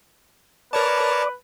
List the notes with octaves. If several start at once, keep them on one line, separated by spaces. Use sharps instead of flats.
A#4 B4 C#5 D5 A5 D6